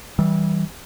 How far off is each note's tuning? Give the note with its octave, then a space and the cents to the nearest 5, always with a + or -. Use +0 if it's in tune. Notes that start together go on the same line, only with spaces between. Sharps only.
E3 -25 G3 -20